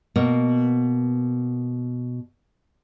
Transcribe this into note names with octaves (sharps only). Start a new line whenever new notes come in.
B2 A#3